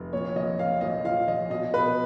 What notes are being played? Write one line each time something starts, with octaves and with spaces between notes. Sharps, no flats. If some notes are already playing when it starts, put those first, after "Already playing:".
Already playing: F1
A#2 C#5
A#1 D#5
A#2 F5
A#1 D#5
F3 F5
A#1 D#5
B2 D#5
B2 B4